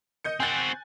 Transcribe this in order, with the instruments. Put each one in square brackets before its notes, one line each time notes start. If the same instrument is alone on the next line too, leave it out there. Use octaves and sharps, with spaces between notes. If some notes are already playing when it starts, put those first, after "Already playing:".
[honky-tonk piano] D#5 G6 C#7
[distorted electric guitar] C4 F#4 [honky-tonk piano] G#5 F#6 A6